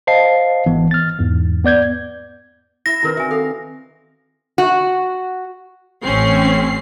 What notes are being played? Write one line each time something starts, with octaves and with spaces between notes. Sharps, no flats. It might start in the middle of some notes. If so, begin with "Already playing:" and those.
C5 D#5 F5 A5 C7
G#1 E3 B3
F6 A6
E2 G#2
B3 D5 G6 G#6
E4 E5 A#6
D#3 C4 D4 E4 A#4 B4
F#4 E5 G#5
A4 F5
F#4
A1 C4 C#4 C7